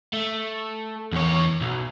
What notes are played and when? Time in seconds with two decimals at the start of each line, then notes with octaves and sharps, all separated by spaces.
0.13 A3
1.12 E2 C#5
1.61 B1